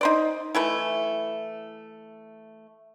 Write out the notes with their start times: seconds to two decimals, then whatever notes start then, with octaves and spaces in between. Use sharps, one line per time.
0.01 D#4 C5 D5
0.55 E3 A3 E4